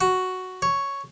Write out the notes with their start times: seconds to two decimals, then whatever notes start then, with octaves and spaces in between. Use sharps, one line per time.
0.01 F#4
0.62 C#5